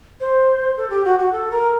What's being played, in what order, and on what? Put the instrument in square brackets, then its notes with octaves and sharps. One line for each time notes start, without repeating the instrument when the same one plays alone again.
[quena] C5
A4
G4
F#4
F#4
A4
A#4